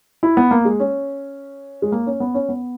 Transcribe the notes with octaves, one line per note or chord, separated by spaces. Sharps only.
E4
B3
A#3
G#3
C#4
G#3
A#3
C#4
B3
C#4
B3